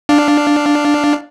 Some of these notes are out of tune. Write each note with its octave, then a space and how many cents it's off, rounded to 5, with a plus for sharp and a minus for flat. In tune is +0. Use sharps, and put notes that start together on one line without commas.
D4 +0 F5 +0